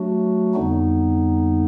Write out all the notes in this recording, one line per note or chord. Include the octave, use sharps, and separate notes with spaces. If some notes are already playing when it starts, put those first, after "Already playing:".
Already playing: F#3 A3 D4 F#4
F2 D3 G3 B3 D#4